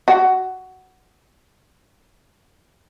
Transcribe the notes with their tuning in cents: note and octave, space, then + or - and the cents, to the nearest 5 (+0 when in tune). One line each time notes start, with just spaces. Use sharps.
F#4 +10